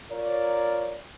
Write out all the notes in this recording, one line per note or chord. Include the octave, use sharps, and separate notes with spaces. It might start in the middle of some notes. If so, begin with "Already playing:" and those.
F4 A#4 C#5 D5